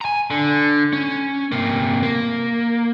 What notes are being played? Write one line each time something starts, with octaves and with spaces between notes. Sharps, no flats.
G#5 A#5
D3
C#4
C3 A#3
A#3